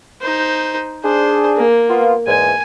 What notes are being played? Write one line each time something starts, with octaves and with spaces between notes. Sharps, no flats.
D#4 C5
D4 G#4 C5
A#3
B3 F4
E2 G#2 G#5